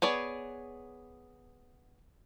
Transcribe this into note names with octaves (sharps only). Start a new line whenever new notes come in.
B3 G#4 C#5 D5